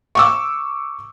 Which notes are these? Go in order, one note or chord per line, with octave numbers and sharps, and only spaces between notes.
C#6 D6 E6